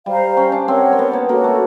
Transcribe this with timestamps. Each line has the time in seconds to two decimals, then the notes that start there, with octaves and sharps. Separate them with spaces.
0.06 G3 C5 F5 A#5
0.37 C#4
0.52 D4
0.68 C4 A#4 C#5 F#5
0.93 C4
0.99 B3
1.13 A#3
1.29 A#3 F#4 A4 C#5
1.44 A3